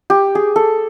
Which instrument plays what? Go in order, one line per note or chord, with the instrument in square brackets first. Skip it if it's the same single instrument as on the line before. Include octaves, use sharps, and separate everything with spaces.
[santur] G4
G#4
A4